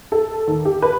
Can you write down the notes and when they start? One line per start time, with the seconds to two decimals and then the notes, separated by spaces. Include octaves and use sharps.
0.12 A4
0.48 D#2
0.65 G4
0.82 B4